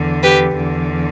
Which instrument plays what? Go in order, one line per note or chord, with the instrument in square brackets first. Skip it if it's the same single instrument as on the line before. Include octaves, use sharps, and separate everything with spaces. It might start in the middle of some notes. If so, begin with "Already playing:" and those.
Already playing: [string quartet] E2 D3
G4 B4
E2 D3